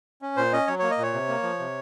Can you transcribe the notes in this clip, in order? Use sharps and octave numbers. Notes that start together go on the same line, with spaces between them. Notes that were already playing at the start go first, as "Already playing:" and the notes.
C#4
A#2 C5
C#4 D#5
F#3 C#5
A#3 C#5
D#5
A#2 C#5
C3
A#3
F3
C3